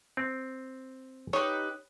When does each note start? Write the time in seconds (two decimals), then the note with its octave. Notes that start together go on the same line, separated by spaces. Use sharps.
0.17 C4
1.33 D#4 G4 B4 C#5